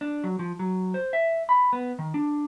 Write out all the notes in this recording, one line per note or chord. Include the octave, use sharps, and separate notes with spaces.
D4
F#3
F3
F#3
C5
E5
B5
B3
D#3
D4